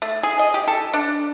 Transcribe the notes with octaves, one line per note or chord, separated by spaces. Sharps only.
A3
G#4
D#5
G4
A4
D4